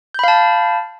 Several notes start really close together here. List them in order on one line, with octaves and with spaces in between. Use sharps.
G6 B5 F5 A5